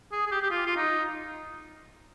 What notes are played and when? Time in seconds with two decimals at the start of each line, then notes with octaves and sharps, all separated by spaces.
0.12 G#4
0.26 G#4
0.31 G4
0.42 G4
0.50 F4
0.66 F4
0.76 D#4